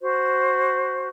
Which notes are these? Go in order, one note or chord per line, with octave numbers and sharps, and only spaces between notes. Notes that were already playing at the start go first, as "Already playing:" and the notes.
F#4 C5